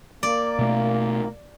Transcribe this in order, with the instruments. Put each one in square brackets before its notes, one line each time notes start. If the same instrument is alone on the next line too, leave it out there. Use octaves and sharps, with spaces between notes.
[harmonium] A#3 [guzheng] D5
[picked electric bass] B2 A3